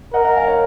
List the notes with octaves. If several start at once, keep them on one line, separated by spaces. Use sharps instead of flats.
A#4 D#5 F#5
F#5 A#5
F5 G#5
C#5 F5